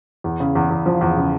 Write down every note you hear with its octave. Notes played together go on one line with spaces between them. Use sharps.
E2
C#3
E2
E2
F3
E2
C#3